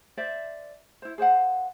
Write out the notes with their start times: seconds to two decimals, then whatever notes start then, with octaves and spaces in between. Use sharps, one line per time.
0.17 C5 D5 E5
1.02 E4 C5
1.18 G#4 C5 F5 F#5